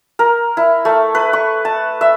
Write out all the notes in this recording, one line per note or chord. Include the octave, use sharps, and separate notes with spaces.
A#4
E4
A3
B4
C#6
A5
E5